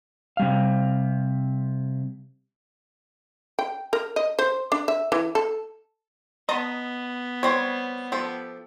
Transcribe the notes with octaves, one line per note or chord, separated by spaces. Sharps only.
C3 G3 F5
G5
A#4
D#5
C5
D4
E5
E3
A4
B3 D#5 A5 A#5
G3 C4 C#5
F3 G4 A4